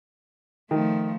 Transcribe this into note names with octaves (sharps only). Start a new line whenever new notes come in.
D#3 F3 A3